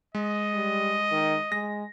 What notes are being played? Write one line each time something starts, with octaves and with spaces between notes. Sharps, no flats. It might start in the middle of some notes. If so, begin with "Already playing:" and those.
G#3 D#5
G3
D#3
G#3 A#6